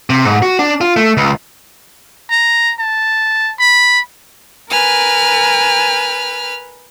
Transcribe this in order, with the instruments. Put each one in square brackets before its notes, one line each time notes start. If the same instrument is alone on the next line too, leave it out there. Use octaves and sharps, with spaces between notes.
[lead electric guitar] C3
G#2
F#4
D4
F4
A3
C#2
[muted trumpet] A#5
A5
B5
[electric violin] A#4 G#5 [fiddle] B4 F6